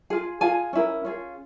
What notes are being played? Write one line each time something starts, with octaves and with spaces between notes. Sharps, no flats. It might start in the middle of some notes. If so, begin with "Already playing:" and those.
F4 G#4
F4 G#4 G#5
C#4 E4 A#4
C#4 F4 G#4